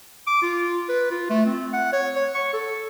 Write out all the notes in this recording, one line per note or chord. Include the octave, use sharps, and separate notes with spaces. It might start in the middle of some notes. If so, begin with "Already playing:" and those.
D6
F4
B4
F4
A3
C4
F#5
C#5
C#5
C#6
A4